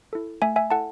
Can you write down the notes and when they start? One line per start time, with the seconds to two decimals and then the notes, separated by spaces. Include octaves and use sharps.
0.13 E4 A4
0.42 A3 E5 G#5
0.56 E5 G#5
0.71 E4 A4 F#5 A5